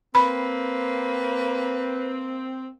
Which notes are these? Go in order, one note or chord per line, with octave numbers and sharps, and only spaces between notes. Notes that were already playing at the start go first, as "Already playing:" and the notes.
A#3 C4 B4 B5